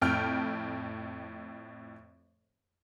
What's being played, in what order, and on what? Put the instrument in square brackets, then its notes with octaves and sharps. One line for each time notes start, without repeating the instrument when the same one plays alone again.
[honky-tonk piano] F2 A2 G5 F6